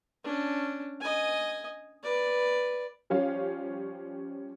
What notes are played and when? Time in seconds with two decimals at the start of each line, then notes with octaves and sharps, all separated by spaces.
0.24 C#4 D4
1.01 D#5 G#5
2.03 B4 D5
3.10 F3 G3 C#4 C#5 F5